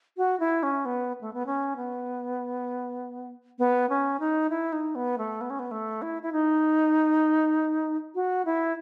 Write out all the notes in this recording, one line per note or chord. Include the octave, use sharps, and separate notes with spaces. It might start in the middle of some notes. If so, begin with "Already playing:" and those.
F#4
E4
C#4
B3
A3
B3
C#4
B3
B3
C#4
D#4
E4
D#4
B3
A3
B3
C#4
B3
A3
E4
E4
D#4
F#4
E4